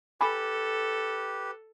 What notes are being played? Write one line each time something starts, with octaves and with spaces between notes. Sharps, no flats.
G4 A4 B4 G#5 B5 D6